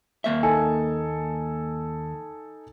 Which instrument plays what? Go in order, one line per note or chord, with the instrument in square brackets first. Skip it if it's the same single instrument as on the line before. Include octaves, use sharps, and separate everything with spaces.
[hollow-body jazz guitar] D#2 A#3 E5
[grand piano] D#4 A4 G#5